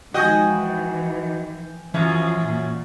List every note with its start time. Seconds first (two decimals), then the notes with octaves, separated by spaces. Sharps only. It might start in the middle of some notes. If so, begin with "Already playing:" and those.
0.14 D#3 F3 G#3 F#4 D#5 G5 G#5
0.47 E3 F3
1.94 F#2 E3 F3 C#4 F4
2.44 A#2